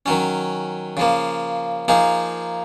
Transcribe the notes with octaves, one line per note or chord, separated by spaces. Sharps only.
D#3 F#3 C#4
C#3 F3 A#3
F3 A#3 D#4 G#4